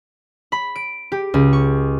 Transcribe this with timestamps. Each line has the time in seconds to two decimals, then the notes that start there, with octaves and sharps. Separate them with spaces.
0.52 B5
0.76 D7
1.12 G4
1.34 C#2
1.53 C#6